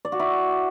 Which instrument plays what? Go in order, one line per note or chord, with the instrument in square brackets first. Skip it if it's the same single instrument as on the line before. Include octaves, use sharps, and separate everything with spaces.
[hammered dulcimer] D5
F#4
E4